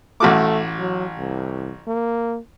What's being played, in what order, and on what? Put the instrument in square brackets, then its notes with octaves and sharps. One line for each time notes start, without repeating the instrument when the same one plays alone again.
[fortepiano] A1 F#4 D6 [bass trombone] A3
[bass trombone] F#3
C2
A#3